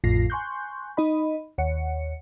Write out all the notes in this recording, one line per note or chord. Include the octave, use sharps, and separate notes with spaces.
A1 F2 A2 F4 A#6 C7
G#5 C6 C#6 F#6 G6
D#4 D#5 B5
D#2 C#5 F#5 C#7